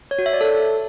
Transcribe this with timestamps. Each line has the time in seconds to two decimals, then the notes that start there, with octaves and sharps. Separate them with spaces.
0.11 C#5
0.18 F#4
0.26 E5
0.33 D5
0.41 A4